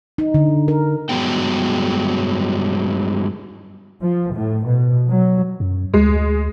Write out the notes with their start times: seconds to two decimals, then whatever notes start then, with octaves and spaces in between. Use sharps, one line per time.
0.18 D#4
0.34 D3
0.68 A#4
1.09 G2 F3 F#3 G#3 B3 G5
4.02 F3
4.34 A2
4.67 B2
5.08 F#3
5.60 F#2
5.94 D2 G#3